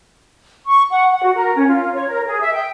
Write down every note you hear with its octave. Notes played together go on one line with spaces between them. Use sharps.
C#6
F#5
F#5
F#4
A#4
C#4
F4
C#5
A#4
G#4
E5
G5